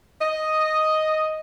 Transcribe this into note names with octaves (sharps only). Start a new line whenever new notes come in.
D#5